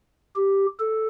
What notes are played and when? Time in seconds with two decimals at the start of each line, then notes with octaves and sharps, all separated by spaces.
0.36 G4
0.79 A4